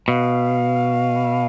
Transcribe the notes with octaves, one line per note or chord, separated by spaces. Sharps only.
B2 F5